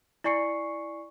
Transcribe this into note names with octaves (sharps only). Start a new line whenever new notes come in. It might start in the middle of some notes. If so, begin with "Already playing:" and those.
E4 D5 G#5 C#6 C7 C#7